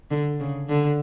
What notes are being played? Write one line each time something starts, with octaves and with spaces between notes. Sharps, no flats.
D3
C#3
D3